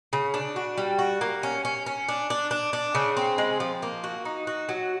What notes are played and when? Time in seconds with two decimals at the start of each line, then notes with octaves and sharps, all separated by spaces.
0.13 C#3
0.34 D4
0.56 F#4
0.78 G3
0.99 F#4
1.21 A#3
1.43 C#4
1.65 C#4
1.86 C#4
2.09 D4
2.30 D4
2.51 D4
2.73 D4
2.95 C#3
3.17 C4
3.38 G#3
3.60 F3
3.83 A#3
4.04 F#4
4.25 D#4
4.47 F#4
4.69 F#3